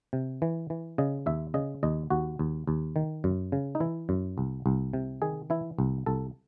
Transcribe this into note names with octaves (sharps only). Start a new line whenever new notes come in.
C3
E3
E3
C#3 D#5
D#2 E5
C#3 D#5
D#2 D#5
D#2 F#4
D#2
D#2
D#3
F#2
C#3
D#4
E3 E4
F#2
C2
C2
C3
D#3 G#4
E3 E4
C2
C2 A4